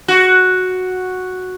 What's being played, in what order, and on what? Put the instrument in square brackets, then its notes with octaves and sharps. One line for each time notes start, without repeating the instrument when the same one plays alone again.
[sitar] F#4